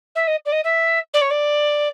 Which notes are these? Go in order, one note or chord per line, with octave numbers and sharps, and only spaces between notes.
E5
D#5
D5
D#5
E5
D5
C#5
D5